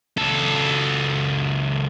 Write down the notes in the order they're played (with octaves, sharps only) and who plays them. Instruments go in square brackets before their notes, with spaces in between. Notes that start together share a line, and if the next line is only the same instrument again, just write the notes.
[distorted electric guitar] C#2 A4